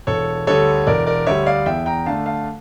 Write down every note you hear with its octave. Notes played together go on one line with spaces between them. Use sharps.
E1 A4 C#5
D2 D3 G3 A4 C#5
E1 A#4 D5
A#4 D5
D2 D3 G3 C#5 E5
D5 F5
E2 E5 G5
G5 A#5
D3 A3 D4 F5 A5
F5 A5